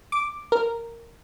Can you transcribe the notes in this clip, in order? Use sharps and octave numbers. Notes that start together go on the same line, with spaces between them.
D6
A#4